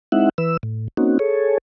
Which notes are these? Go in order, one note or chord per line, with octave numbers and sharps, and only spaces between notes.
G#3 C4 D#4 E4 E5 F#5
E3 B4 E6
A2
A#3 C4 C#4 D#4 F#4
G#4 A4 C#5